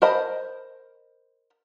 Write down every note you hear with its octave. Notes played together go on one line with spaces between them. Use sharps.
A#4 C5 D#5 A5 B5